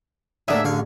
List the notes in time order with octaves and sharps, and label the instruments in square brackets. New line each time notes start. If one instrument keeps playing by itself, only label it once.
[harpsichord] A2 D3 A#3 [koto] D4 G#4 [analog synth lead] E5
[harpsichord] A1 F5 C#6 [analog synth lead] D3